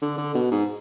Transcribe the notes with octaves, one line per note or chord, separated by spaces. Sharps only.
D3
D3
B2
G#2